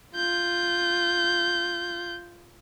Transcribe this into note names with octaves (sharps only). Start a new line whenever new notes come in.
F4 G6